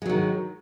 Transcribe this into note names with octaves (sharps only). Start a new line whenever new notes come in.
D#3 F#3 G#3